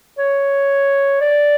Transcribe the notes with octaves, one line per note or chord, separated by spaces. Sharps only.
C#5
D5